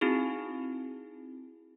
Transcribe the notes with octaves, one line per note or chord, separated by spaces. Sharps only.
C4 D#4 E4 F#4 G#4